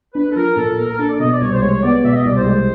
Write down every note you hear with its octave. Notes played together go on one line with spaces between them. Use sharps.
D4 B4
A4
F3 A#4
A#2 A4
A#3 A#4
A#4
D4 A4
D5
B2 D#5
D5
C2 C#5
C5
G#3 C#5
B3 D5
B2 E5
D#5
C2 D5
C5
G#3